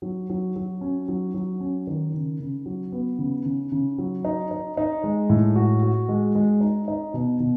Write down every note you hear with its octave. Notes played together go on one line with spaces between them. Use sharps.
F#3
F#3
F#3
C#4
F#3
F#3
C#4
D#3
C#3
C#3
F#3
B3
C#3
C#3
C#3
F#3
D#4
D#4
D#4
G#3
A2
F#4
F#4
G#3
G#3
D#4
D#4
B2
B2